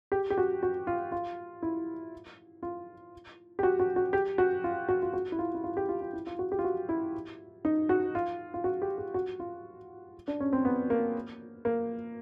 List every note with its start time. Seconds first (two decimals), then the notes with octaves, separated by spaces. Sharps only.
0.12 G4
0.30 G4
0.38 F#4
0.63 F#4
0.87 F4
1.12 F4
1.63 E4
2.63 F4
3.59 G4
3.63 F#4
3.80 F#4
3.96 F#4
4.13 G4
4.38 F#4
4.64 F4
4.89 F#4
5.02 F4
5.13 F#4
5.32 E4
5.39 F4
5.54 E4
5.64 F4
5.77 G4
5.89 F4
6.02 F4
6.13 E4
6.27 F4
6.39 F#4
6.52 G4
6.59 F4
6.64 F#4
6.89 E4
7.65 D#4
7.89 F#4
8.15 F4
8.54 F4
8.64 F#4
8.82 G4
8.98 G4
9.14 F#4
9.40 F4
10.28 D4
10.40 C#4
10.53 C4
10.65 B3
10.90 A#3
11.65 A#3